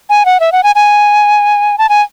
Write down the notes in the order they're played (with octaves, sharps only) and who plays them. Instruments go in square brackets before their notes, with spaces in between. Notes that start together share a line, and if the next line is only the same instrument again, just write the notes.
[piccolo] G#5
F#5
E5
F#5
G#5
G#5
A5
G#5